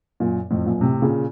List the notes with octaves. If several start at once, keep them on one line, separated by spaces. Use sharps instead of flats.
F#2 A#2
F2 A2
F#2 A#2
A2 C3
A#2 C#3